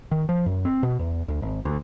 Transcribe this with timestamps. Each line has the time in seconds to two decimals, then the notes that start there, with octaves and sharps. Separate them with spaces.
0.11 D#3
0.29 F3
0.46 F#2
0.65 C4
0.83 B2
0.99 E2
1.28 D2
1.42 G#1
1.65 D2